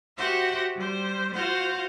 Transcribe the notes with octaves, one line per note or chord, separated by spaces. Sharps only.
F#4 G4 C5 E5 F#5
G3 C5
F4 F#4 C5 F5 F#5